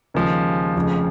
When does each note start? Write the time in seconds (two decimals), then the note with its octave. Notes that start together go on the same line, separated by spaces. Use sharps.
0.14 D#2 C#3 F3 G#3
0.76 F1 F2 C#3 F3